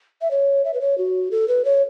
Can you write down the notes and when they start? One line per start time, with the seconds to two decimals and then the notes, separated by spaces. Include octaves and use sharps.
0.21 E5
0.31 C#5
0.65 E5
0.74 B4
0.81 C#5
0.98 F#4
1.31 A4
1.48 B4
1.65 C#5